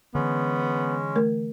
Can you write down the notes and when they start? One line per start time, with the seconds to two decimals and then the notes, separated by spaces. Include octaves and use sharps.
0.15 D3 E3 G#3 B3 C#4
1.16 A3 A#4